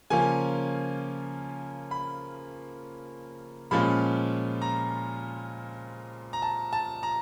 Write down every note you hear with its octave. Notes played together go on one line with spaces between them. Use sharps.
C#3 F3 A#3 C#4 F4 G#5
B5
A#2 F3 G#3 C#4 F4 B5
A#5
A#5
A5
A5
A#5